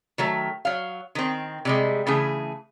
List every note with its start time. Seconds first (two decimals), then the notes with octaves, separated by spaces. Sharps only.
0.18 D#3 F#3 A3
0.65 F#3 F5
1.15 D#3 C4
1.65 C3 G3 G#3
2.07 C#3 E3 A3 G#4